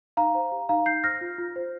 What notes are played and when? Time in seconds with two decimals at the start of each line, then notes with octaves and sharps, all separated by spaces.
0.17 D#4 F5 A#5
0.35 C5
0.52 G4
0.69 D#4 F5 A#5
0.86 D#4 G6 C7
1.04 C5 F6 A#6
1.21 F4
1.38 F4
1.56 C5